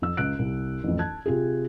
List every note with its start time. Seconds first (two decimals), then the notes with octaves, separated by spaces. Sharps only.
0.02 F2 E6
0.17 C#2 F#6 D7
0.39 C2
0.84 A1 F2
0.99 A5 F#6 G#6
1.26 C3 F4 G4 G#4